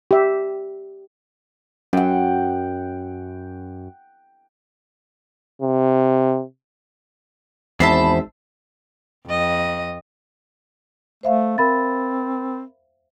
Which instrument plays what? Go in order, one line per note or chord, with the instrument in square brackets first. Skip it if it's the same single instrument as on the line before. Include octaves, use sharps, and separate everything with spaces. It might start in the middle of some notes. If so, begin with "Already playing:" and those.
[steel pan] G4 E5
[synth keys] F#2 [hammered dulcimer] F#5 G5
[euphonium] C3
[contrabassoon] G#1 [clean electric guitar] E2 [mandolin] C5 E5 A5 [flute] B5
[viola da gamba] F2 D#5
[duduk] A3 [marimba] C5 E5 F5
[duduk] C4 [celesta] A#4 B5 A6